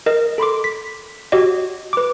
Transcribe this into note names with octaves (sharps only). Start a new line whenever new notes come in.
A#4 D#5
A4 B5 C6 D6
B6
F#4 G4 C#5 D#5
B4 D6